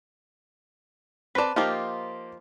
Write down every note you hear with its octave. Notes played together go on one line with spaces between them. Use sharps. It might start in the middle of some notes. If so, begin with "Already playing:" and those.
C4 B4 D5 A5
F3 A#3 D#4 F4 G4